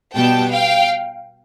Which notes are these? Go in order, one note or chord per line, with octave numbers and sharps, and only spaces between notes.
B2 G3 B3 G5 A5
F5 G5